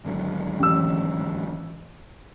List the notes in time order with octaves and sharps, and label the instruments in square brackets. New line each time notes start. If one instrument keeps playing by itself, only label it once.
[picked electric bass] G#1 D3 F#3
[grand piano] A1 E6